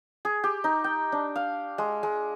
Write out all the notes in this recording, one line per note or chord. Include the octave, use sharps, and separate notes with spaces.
G#4
G4
D#4
G5
D4
F5
G#3
G#3